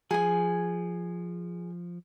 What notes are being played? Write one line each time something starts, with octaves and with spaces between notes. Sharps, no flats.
F3 G#4 G#5